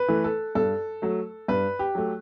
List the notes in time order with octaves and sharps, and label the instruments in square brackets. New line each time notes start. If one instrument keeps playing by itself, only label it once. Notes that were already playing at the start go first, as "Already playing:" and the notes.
Already playing: [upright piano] B4
E3 A3
A4
G2 A4
F#3 A3
G2 B4
G4
F#3 A3